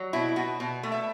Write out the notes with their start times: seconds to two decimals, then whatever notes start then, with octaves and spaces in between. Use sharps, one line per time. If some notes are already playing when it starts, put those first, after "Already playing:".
Already playing: F#3
0.13 B2 E4
0.36 B2 F#4
0.60 B2
0.83 A3
0.92 E5